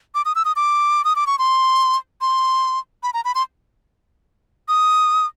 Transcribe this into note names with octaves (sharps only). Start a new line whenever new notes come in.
D6
D#6
E6
D#6
D6
D#6
D6
C#6
C6
C6
B5
A#5
B5
C6
D#6